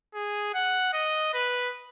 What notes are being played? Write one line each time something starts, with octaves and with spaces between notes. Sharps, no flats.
G#4
F#5
D#5
B4